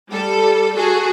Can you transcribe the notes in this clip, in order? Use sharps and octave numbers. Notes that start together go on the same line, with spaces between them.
G3 A4
F#4 G#4 A4